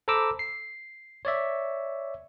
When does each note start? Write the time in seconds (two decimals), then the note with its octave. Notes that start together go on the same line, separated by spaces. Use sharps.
0.08 A4 C5 A#5 B5 D6 E6
0.39 C7
1.25 C#5 D5 E5